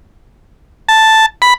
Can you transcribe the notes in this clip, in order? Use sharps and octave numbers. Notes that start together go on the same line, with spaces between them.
A5
B5